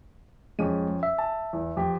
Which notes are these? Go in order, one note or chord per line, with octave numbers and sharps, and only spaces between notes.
F2 G#3 C#4 D#7
E5
A5
E2
F2 G4